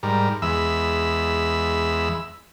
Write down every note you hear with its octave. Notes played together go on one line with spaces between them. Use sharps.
G#2 G3 A#4
E2 G#3 E5 B5 E6